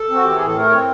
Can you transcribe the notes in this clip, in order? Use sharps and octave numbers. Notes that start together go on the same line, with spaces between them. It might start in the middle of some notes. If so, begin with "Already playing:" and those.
Already playing: A4
C4 F#4
E3 G4
G#4
A2
A4
A3 A#4
C4 C#5